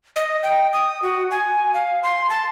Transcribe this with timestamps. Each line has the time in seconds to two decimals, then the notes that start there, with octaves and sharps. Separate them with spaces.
0.16 D#5
0.43 G5
0.73 D#6
1.02 F#4
1.31 G#5
1.74 F5
2.03 C6
2.29 A5